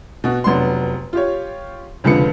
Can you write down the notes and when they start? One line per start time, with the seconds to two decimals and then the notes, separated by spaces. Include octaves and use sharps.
0.24 B2 F#4
0.44 F1 F#3 B3 D4 C6
1.13 F4 G4 C#5
2.04 F1 C#2 D3 F3 B4 C#7